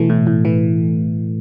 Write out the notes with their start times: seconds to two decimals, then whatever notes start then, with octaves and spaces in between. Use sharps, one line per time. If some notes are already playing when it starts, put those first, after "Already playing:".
Already playing: B2 E3 A3
0.10 A2
0.27 A2
0.45 E3